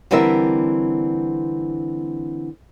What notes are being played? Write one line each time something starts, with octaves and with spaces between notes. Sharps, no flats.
D3 E3 G3 C4 A#4 E5